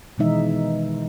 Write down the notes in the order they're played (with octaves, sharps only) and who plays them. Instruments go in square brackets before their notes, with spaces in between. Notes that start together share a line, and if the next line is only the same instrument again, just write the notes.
[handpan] B2 D#3 E3 G#3 D#4 E5